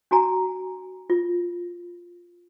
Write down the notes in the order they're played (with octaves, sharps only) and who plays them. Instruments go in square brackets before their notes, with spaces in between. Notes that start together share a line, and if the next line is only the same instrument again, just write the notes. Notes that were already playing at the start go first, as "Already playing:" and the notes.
[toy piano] D4 F#4 G#5 A#5
F4